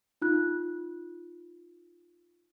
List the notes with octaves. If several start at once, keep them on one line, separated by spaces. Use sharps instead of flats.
D#4 F4 F#6